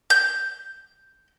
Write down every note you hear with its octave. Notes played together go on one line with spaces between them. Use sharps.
G6